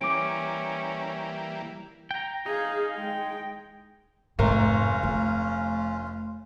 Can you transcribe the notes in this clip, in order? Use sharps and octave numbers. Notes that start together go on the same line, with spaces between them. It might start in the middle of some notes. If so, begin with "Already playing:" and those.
E3 G3 A#3 C#4 D6 D7
G5 A#5
D#4 G#4 F5
G#3 G5
F1 G#2 C#4 F4 A#4
A3